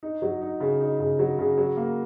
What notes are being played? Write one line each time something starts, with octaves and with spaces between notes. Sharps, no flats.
D#4
F#3
D#4
C#3
D#4
C#3
F#3
C#3
F#3
A#3